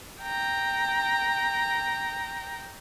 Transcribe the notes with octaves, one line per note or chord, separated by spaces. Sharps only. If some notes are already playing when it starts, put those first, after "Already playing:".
G5 A#5